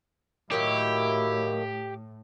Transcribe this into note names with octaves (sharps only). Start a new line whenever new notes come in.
A2 D#3 F#3 A#3 E4 G4